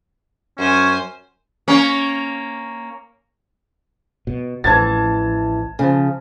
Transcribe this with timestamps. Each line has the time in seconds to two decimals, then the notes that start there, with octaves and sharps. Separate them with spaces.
0.58 F#2 C#4 C5 G#5
1.68 A#3 C#4
4.27 B2
4.64 A1 F2 E3 A5 G#6 A6
5.79 C#3 F3